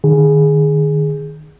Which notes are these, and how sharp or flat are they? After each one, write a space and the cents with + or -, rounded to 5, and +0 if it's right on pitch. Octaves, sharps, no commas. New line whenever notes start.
D#3 -30 G#4 +0